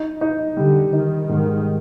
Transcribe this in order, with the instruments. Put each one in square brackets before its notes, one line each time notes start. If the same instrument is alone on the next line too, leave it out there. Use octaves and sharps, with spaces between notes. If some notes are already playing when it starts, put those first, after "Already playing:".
Already playing: [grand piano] D#4
D#4
[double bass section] D3 [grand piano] G3
[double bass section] D#3 [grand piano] D#4
[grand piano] G#2 [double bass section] D#3